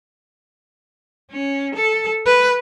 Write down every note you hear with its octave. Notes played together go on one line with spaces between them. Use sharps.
C#4
A4
B4